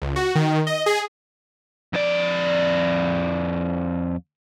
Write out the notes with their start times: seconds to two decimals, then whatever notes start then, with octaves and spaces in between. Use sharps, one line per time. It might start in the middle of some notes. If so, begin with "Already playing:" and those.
0.02 C#2
0.16 F#4
0.35 D#3
0.67 D#5
0.86 G#4
1.93 F2 D5